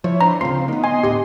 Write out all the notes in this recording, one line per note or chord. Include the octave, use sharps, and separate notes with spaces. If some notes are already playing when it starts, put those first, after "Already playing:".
F3 E4 C#5
D4 B4 C5 A#5
D2 C#3 C4 F4 C6 C7
A#3 B3 D#4
D#5 G#5 C6
D2 A2 G4